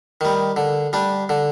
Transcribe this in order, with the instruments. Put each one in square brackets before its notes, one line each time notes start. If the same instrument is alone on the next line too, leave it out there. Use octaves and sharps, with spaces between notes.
[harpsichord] D#3 G3
D3
G3 D4
D3